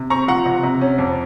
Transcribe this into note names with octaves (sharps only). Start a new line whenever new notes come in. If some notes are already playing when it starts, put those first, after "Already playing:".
Already playing: C3
C4 A#5 C#6
F3 F#5 A#5
C3
C3
C#4
F2